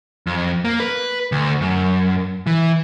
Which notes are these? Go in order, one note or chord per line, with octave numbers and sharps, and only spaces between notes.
F2
A#3
B4
D2
F#2
E3